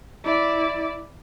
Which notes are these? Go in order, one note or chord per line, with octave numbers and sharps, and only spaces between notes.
E4 D5